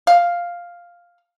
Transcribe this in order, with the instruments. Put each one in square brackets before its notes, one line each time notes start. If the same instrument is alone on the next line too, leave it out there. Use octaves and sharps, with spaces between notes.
[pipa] F5